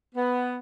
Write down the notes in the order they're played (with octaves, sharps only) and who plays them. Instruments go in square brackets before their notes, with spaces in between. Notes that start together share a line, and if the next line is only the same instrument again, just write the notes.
[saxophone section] B3